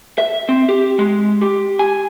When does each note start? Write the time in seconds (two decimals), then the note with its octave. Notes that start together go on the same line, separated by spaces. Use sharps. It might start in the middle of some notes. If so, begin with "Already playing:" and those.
0.18 E5
0.49 C4
0.69 G4
0.99 G#3
1.41 G4
1.79 G#5